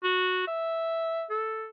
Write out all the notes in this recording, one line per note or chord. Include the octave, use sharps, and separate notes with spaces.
F#4
E5
A4